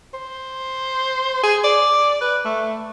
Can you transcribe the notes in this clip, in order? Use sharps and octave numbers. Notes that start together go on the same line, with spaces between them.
C5
G#4
D5
B4
A3